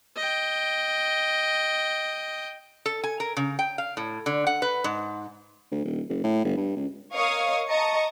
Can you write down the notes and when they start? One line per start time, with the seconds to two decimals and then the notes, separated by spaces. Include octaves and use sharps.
0.16 D#5 G5
2.86 A4
3.04 G#5
3.20 A#4
3.37 C#3
3.59 G5
3.78 F5
3.97 A2
4.26 D3
4.47 F#5
4.62 B4
4.84 G#2
5.71 D2
5.85 D#1
6.09 F#1
6.24 A2
6.44 G1
6.57 G2
6.76 C#2
7.14 A#4 C#5 D#5 F5 C#6 D#6
7.69 D#5 A5 A#5 C#6 D#6 C#7